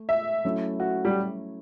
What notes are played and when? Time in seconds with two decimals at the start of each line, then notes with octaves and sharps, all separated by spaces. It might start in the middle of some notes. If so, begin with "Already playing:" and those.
Already playing: A3
0.09 E5
0.45 F#3 A3 C#4 E4
0.80 F#4
1.05 G3